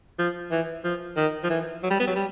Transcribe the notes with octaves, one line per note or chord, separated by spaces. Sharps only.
F3
E3
F3
D#3
F3
E3
F#3
G3
B3
F#3
G3